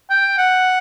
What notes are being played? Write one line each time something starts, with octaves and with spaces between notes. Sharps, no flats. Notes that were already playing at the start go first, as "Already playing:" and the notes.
G5
F#5